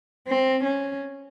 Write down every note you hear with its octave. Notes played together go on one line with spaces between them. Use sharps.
C4
C#4